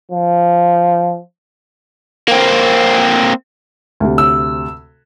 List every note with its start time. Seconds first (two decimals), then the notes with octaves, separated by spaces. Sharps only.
0.12 F3
2.28 A#3 C4
4.00 D2 C3
4.18 E6